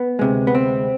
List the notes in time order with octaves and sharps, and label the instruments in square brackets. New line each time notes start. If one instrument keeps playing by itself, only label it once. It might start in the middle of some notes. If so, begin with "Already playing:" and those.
Already playing: [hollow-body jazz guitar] B3
D2 C3 G#3
B3
C4